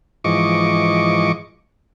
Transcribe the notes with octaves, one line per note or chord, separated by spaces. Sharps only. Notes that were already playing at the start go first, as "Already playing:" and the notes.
G#2 E3 F3 D#5 C#6 D6